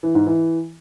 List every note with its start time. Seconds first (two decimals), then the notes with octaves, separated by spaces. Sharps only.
0.03 E3
0.15 G#2
0.26 E3